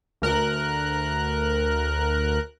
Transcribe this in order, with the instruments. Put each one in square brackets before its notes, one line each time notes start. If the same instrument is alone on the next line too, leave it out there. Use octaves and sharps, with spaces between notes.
[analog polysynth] D2 A#4 F#6